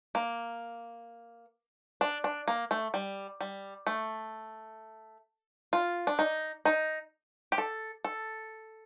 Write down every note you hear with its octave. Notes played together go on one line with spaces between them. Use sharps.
A#3
D4
D4
A#3
A3
G3
G3
A3
F4
D4
D#4
D#4
G4
A4
A4